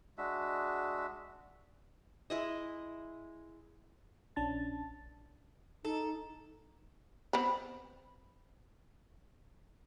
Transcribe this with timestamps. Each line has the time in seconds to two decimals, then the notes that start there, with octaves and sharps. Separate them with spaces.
0.18 G#3 D4 F#4 E5
2.30 G#3 E4 D#5
4.36 A#1 C#4 D4 A5 A6
5.85 D#4 A4
7.33 B3 C4 B5